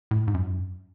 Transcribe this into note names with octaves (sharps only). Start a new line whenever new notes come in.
A2
G#2
F#2